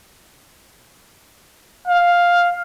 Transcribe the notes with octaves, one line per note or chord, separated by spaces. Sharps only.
F5